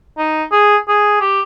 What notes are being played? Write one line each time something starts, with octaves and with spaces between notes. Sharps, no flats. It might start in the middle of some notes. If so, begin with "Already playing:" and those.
D#4
G#4
G#4
G4